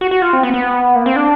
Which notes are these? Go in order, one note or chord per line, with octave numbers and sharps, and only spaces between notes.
F#4
F#4
F4
C4
B3
B3
A#3
C4
D4